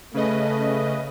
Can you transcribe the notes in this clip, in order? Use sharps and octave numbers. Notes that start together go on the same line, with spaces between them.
C#3 A3 B4 D#5